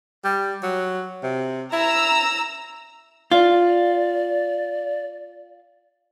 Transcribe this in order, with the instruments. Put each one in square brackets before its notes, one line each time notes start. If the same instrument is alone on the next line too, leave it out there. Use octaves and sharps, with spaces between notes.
[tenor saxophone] G3
F#3
C3
[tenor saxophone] E4 [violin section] A#5 E6
[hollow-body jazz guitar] F4 [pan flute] D5